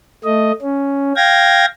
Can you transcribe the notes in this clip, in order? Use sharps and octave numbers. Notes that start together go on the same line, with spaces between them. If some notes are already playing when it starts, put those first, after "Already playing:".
A3 D#5
C#4
F5 G5 G#6 A#6